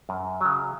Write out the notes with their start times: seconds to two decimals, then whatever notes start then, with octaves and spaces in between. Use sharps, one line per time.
0.09 F#2
0.41 C#3 F#3